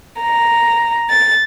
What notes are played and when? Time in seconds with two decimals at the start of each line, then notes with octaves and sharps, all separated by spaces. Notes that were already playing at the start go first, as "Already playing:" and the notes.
0.22 A#5
1.09 A6